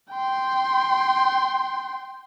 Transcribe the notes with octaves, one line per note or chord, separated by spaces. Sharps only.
G5 C6